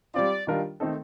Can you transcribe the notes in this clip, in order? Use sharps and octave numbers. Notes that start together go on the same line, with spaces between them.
G3 C4 F4 D5
D#3 G3 D4 F4 A#4
D#3 A3 C4 D#4 A4